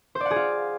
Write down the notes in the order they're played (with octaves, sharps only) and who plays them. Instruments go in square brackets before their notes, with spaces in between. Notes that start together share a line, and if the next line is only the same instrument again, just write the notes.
[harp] C5
D5
F#5
G#4
F4